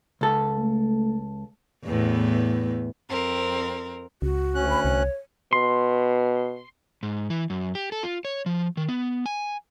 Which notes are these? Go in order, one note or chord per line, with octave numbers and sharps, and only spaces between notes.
C#2 A4
A3
E2 A2 B3
F2 C4 A#4
C#2 F#4
D2 C#4 F#6
B5
C2 C#5
B2 C6
G#2
E3
F#2
G4
A4
F4
C#5
F3
D#3
B3
G#5